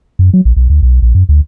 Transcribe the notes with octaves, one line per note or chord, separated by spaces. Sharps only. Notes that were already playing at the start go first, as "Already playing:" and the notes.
F#2
F#3
A#1
B1
D2
B1
A#1
F#2
D2